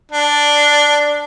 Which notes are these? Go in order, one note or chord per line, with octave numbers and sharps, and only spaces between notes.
D4